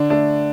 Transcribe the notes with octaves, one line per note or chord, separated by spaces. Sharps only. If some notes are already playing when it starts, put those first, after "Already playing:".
Already playing: D3 D4
A3 D4